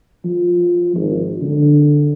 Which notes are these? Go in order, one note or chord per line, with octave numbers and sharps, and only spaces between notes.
F3
G#1
D3